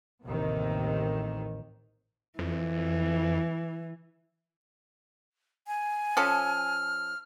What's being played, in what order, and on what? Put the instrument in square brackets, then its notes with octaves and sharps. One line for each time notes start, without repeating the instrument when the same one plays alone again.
[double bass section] A1 D#2 C3 D#3
[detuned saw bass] F2 [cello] E3
[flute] G#5
[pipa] F3 C#4 A4 [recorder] F6